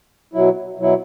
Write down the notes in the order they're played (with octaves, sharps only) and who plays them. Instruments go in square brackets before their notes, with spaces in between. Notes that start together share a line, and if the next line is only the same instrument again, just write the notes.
[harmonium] B2 F#3 E4
B2 F#3 E4